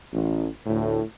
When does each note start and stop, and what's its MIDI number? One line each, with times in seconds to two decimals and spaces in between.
0.12 0.47 33
0.66 1.00 38
0.66 1.00 45